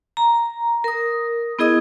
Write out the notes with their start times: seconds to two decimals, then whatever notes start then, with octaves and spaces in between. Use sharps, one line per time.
0.17 A#5
0.84 A#4 D#6
1.59 B3 E4 G#4 D#5 D#6